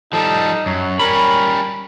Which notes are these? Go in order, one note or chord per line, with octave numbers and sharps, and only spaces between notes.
F3 G3 D#4 A4
F#2 F#3 C#5
G3 C#4 A#4 B5